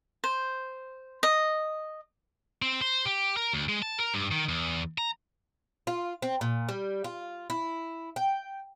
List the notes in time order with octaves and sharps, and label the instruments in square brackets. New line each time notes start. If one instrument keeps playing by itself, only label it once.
[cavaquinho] C5
D#5
[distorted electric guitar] C4
C5
G4
A#4
D2
G#3
A5
A#4
G2
D#3
E2
A#5
[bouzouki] F4
C4
A#2
G3
F4
E4
G5